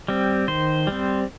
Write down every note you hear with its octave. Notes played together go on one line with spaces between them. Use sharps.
G3 C4
D#3 C5
G3 C4